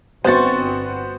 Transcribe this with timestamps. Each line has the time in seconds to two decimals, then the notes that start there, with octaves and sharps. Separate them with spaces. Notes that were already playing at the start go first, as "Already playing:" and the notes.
0.24 G1 B3 C4 F#4 C5 C6 C#6 A6